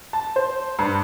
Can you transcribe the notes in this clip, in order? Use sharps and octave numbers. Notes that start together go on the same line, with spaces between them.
A5
C5
G2